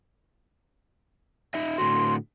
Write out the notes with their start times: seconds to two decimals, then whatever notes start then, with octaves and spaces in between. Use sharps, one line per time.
1.54 D#4 D#5 E5
1.78 A2 D3 F#4 C6